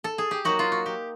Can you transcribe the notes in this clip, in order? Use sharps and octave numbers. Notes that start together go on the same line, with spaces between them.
A4
G#4
G4
F#3 A#3 D#4 F#4
F4
F#4
G4